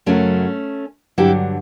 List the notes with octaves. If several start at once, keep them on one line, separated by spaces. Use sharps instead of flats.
F#2 C#3 F#3 A3 C#4
G2 D3 F#3 E4 G4